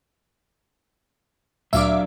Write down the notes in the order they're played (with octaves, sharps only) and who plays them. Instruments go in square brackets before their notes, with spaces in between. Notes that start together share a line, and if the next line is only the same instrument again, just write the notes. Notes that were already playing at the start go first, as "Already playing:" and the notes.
[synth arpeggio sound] D2 A#2 [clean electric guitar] F#3 D4 [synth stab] E5 F5 D6